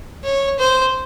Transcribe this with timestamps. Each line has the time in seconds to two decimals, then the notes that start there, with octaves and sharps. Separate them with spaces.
0.24 C#5
0.59 C5